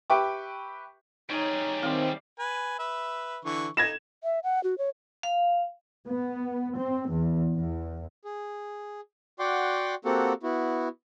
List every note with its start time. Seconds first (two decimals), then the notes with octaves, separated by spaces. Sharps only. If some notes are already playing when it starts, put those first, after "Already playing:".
0.10 G4 B4 E5 G5 C#6 D6
1.30 G3 D#4 G#4 C#5
1.83 D#3 C4 D5 E5 F5
2.39 B4 G#5
2.79 B4 E5
3.45 D3 E3 C#6
3.77 D#4 G#6 A#6 E7
4.24 E5
4.44 F#5
4.64 F#4
4.78 C#5
5.23 F5
6.09 B3
6.78 C4
7.12 E2
7.57 E2
8.25 G#4
9.39 F#4 D5 F#5 G5 C6 D6
10.05 A#3 C4 F#4 G4 A4 F#5
10.43 B3 E4 F#4